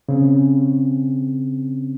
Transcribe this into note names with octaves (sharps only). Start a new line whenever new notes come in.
C#3 C4 C#4